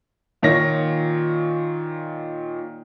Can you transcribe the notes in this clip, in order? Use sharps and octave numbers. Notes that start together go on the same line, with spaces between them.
A#2 D#3 C#5 A#6